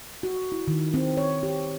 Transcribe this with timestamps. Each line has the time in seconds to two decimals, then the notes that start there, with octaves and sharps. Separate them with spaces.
0.23 F#4
0.52 E4
0.67 D#3
0.94 C4
1.17 C#5
1.43 G4